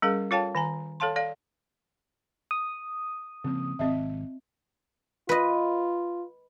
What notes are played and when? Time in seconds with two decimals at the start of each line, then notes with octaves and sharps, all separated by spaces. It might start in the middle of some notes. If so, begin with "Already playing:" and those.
0.02 G3 C#4 G#4 A#4 F5
0.31 F4 A4 C#5 F5 G5 A5
0.55 D#3 G#5 A#5
1.00 A4 C#5 F5 A5 C6
1.16 A4 D5 F5
2.51 D#6
3.44 C#3 F3 A#3 C4
3.79 G#1 C3 C4 D#5 E5
5.29 F4 B4 D#5